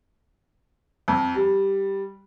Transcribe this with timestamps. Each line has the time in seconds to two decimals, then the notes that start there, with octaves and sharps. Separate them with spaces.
1.08 F2
1.35 G3